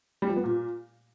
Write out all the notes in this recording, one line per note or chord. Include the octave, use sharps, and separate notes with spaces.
G3
F3
B3
A#2